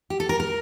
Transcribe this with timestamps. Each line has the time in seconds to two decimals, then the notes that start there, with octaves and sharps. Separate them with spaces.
0.10 G4
0.20 A4
0.29 A#4
0.40 A#4